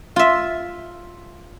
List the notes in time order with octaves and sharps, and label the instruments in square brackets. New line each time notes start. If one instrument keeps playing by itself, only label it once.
[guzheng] F4 E5